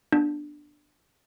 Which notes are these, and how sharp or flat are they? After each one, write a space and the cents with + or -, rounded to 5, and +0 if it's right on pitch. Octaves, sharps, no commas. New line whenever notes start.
B3 -15 D4 +10